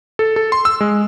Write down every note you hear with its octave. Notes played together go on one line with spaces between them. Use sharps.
A4
A4
C6
E6
G#3